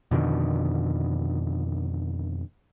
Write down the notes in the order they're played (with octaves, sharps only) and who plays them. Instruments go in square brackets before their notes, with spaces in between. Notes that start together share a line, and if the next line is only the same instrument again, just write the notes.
[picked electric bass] F2 B2 D3 D#3